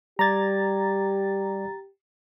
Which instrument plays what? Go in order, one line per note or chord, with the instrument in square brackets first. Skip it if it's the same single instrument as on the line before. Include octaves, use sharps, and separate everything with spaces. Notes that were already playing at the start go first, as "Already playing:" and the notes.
[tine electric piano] G3 D5 G#6 [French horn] G4 [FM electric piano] A#5 A6